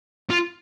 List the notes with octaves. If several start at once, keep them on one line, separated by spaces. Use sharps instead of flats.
F4